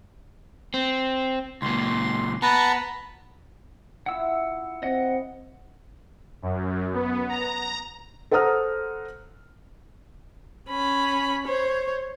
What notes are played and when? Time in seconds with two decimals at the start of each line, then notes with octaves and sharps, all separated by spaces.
0.74 C4
1.62 C#2 A#2 C6
2.42 B3 B4 A5 A#5
4.06 E4 F4 E5 F#5 E6
4.83 C4 D#5 F#5
6.42 F#2
6.94 B3
7.29 A#5
8.31 A4 C5 F#5 A#5 D#6 F6
10.69 C#4 B5
11.46 C5 C#5